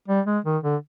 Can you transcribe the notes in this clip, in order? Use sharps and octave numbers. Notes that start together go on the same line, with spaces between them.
G3
G#3
D#3
D3